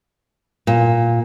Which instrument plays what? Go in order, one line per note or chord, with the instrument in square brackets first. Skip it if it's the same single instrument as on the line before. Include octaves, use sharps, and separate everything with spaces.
[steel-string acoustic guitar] A#2